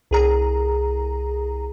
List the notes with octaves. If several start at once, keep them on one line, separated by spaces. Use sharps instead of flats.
C2 G#4 A#5